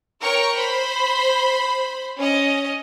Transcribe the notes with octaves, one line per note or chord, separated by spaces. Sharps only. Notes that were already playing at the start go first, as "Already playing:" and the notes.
A#4 C#5 G5 C#6
C5 B5
C#4 D#5